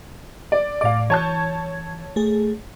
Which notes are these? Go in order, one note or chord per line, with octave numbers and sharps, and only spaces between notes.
D5
A2 D5 F5 D6
E3 C#5 A5 G6 G#6
A3 G#4